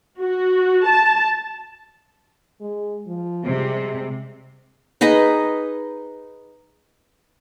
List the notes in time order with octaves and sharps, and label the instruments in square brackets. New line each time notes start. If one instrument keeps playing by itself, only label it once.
[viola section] F#4
A5
[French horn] G#3
F3
[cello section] C3 G3 [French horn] G#3
[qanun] D#4 G#4 B4 D#5